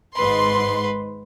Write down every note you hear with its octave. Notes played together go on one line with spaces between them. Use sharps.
G#1 G#2 B4 C6